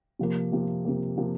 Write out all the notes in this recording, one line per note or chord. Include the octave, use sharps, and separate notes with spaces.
C3 F3 A#3
C3 F3 A#3
C3 F3 A#3
C3 F3 A#3